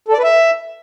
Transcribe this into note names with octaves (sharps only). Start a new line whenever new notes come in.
A4
D5
B4
E5